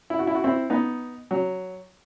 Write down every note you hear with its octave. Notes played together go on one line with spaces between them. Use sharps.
E4
F#4
E4
F#4
C4 E4
B3 D#4
F#3